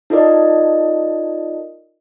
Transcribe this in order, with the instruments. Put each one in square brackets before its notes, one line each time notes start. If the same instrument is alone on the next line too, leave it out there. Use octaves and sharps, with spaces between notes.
[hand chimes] D#4 F4 A4 A#4 D5 D#5